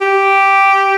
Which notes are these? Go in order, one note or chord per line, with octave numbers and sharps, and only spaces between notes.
G4